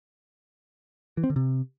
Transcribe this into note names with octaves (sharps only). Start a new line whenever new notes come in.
E3
C4
D3
C3